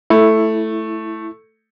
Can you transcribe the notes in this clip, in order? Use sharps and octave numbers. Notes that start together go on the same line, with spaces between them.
A3 E4